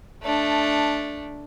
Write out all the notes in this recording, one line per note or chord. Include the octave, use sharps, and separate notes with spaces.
A3 D4